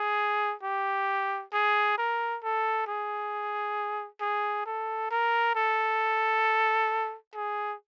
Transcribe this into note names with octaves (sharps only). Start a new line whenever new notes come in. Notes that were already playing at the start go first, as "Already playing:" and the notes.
Already playing: G#4
G4
G#4
A#4
A4
G#4
G#4
A4
A#4
A4
G#4